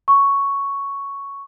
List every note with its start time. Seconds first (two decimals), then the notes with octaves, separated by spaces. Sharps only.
0.08 C#6